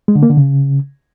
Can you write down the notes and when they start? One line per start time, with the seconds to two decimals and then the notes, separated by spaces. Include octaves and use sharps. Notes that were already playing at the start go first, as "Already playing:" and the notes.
0.08 G#3
0.15 D3
0.23 A#3
0.30 D3
0.37 C#3